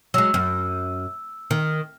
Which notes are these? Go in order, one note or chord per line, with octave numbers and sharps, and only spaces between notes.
F#3 G#3 E6
F#2
D#3